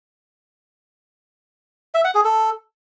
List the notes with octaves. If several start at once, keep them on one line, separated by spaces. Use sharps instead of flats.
E5
F#5
G#4
A4